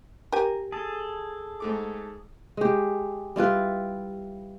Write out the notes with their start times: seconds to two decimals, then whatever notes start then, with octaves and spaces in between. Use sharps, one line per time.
0.32 G4 A#4 G#5
0.72 G#4 A4 A5
1.60 G#2 A3 D6
2.57 G#3 G4
3.36 G3 E4 F4 B4